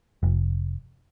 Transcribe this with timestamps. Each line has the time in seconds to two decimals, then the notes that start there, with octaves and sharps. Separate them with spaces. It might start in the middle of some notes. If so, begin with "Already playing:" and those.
0.23 F1